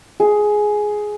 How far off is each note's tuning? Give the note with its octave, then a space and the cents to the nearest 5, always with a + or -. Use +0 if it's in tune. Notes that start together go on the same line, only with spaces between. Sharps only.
G#4 +10